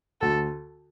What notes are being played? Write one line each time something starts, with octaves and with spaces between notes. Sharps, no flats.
D2 A4